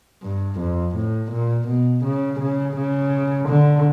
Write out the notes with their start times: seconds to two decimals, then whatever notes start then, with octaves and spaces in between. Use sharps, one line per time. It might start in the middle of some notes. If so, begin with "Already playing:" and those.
0.23 G2
0.60 F2
0.95 A2
1.31 A#2
1.68 B2
2.04 C#3
2.40 C#3
2.76 C#3
3.48 D3